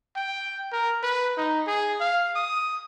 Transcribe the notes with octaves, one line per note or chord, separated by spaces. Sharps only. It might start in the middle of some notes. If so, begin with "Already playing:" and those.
G5
A#4
B4
D#4
G#4
F5
D#6